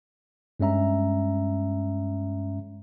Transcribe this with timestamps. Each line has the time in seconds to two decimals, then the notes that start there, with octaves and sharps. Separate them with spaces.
0.60 G2 G#3 C#4 E5 A#5